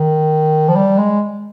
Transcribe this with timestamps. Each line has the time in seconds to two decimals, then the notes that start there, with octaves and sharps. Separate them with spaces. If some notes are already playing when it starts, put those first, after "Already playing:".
Already playing: D#3
0.68 F3
0.76 G3
0.98 G#3